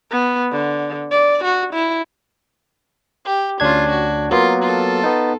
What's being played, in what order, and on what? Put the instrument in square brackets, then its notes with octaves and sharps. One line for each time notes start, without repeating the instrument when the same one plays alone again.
[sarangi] B3
D3
D5
F#4
E4
[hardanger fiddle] G4
[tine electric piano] D2 D4 G#6 [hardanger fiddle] C#4 F4
[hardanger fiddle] F#4
[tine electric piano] F#3 A#3 B3 [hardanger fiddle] F4 A#4
[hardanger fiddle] F4 A4
[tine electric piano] B3 D#4